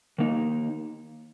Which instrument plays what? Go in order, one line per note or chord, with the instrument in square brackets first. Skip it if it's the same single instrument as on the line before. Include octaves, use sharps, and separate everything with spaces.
[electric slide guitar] D#3 A#3 D#4